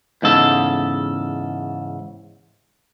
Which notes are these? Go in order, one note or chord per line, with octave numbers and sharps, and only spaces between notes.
E2 G#2 C#3 A4